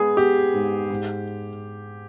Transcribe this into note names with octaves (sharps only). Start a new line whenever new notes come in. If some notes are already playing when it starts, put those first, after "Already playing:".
Already playing: G#3 B3 G#4
B3 G4
G#2
G#2